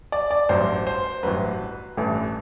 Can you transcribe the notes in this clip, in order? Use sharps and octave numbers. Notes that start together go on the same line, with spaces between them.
D5
D5
A1 G2 F#3 C5
C5
A1 G2 F#3 B4
A1 G2 E3 A3